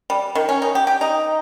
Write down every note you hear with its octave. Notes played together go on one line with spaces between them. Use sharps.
G3
D#3
C#4
D#4
G4
G4
D#4